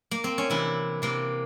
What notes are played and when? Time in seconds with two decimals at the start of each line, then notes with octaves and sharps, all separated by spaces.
0.11 A#3
0.24 C4
0.38 C#4
0.50 C3 E3 E4
1.02 C3 E3 A#3